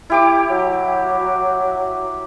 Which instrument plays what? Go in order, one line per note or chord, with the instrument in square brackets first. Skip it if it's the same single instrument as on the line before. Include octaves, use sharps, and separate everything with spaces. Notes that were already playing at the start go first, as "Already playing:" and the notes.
[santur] E4 G4 D6
[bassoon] F#3